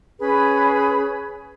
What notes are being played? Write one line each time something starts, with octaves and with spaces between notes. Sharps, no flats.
C#4 G#4 B4 B5